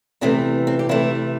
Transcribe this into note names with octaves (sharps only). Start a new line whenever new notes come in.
E2 C3 E3 A3 C4
C4
G4
C3 E3 A3 E4